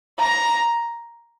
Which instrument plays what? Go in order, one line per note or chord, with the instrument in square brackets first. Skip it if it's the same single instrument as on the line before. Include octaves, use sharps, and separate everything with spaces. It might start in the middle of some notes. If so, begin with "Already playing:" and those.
[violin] A#5